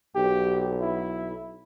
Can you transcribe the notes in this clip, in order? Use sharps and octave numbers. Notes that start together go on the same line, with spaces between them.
B1 G4
E4